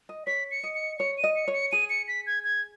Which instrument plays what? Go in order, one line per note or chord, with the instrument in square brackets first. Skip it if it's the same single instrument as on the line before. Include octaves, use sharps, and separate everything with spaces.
[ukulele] D#5
[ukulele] C#5 [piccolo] B6
[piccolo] C#7
[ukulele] D#5
[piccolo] C#7
[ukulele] C#5 [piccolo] C#7
[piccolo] D#7
[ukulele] D#5
[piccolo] C#7
[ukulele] C#5
[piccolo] C#7
[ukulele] G#4 [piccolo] D#7
[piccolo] C#7
B6
G#6
G#6